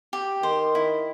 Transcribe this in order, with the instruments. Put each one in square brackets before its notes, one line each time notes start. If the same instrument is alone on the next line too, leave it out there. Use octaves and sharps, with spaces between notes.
[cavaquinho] G4
[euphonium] D#3 [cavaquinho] C5
[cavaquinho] E4